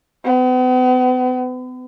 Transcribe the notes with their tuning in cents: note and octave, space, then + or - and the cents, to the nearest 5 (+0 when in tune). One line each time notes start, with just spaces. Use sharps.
B3 +40